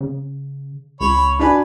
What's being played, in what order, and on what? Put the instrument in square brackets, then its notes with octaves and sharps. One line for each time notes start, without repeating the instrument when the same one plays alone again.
[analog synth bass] C#3
[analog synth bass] C#2 [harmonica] C#5 B5
[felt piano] D4 F#4 G#5 [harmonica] B4